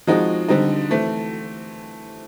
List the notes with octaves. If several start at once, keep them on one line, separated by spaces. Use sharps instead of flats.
F3 G#3 C4 D#4 F#4
D3 G3 C4 D#4
E3 A3 C4